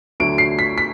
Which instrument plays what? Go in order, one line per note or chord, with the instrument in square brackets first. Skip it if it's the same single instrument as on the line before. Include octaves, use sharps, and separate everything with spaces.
[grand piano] D2 D3 F#3 D7
C7
B6
B6